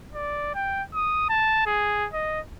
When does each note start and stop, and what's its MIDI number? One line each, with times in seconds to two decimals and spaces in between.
0.14 0.51 74
0.55 0.83 79
0.94 1.29 87
1.29 1.63 81
1.66 2.07 68
2.13 2.40 75